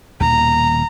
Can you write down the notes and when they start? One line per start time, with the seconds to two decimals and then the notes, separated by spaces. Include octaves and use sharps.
0.20 D#1 D#2 B2 A#5